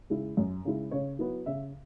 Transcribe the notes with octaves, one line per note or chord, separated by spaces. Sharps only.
C#3 G#3 E4
F#2
C#3 G#3 E4
C#3 C#5
F#3 B3 E4
C#3 E5